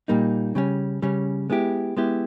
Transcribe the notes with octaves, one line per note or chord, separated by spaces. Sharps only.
A#2 G3 A#3 D#4
C#3 G3 C#4
C#3 G3 C#4
G#3 B3 E4 G4
G#3 B3 E4 G4